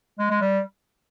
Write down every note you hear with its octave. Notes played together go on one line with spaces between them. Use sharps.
G#3
G#3
G3